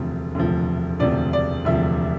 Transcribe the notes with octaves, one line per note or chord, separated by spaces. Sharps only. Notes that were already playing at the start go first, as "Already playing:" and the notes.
Already playing: E1 D2 C3 F3
E1 D2 C3 F3
E1 D2 C3 F3 D5
D5
E1 D2 C3 F3 E5